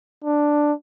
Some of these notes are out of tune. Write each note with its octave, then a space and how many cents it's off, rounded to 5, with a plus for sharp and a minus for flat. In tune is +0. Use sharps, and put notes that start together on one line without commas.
D4 +5